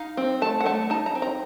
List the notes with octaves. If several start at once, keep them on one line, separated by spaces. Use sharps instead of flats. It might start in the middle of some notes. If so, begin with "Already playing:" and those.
Already playing: D#4 F5
C4
A3 A5
F#5
A3 A5
D#4 A5
A#5
C4
A#5